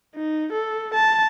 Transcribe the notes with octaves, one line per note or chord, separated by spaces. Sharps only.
D#4
A4
A5